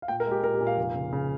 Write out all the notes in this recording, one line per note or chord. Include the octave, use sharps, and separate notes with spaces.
F5
A#2 G5
A#4
G#3
G4
A#2 A#4
G4
A#2
F5
F1
C#3
C#3